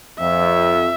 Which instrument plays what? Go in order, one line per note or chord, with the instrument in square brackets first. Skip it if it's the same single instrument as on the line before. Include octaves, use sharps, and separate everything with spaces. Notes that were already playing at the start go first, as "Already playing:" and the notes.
[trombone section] F2 [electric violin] E5